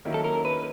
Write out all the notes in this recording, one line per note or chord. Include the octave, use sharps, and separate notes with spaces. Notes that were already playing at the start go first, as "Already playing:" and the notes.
D#3 F#3 A#3 C#4 E4
A4
A#4
B4